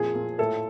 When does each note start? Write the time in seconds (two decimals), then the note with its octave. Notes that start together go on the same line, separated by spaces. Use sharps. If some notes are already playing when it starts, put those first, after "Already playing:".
Already playing: F2 A#2 G#4
0.15 A#2
0.38 A2 A4